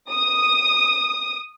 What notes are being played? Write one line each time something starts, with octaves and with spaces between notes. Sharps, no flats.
D#6